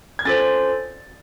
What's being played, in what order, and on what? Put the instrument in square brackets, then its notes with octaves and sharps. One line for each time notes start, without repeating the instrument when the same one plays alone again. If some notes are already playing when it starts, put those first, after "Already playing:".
[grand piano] G#6
[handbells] C#4 F4 A4 C5 [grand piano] A6